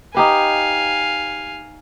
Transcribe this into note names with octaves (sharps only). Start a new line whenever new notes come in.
D#4 G4 B4 F5 G#5